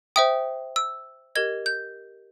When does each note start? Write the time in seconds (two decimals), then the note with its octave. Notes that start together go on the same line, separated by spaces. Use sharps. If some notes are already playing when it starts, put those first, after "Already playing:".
0.16 C5 E5 G5 D#6
0.76 E6
1.35 G4 A#4 D#5 G#6
1.66 G6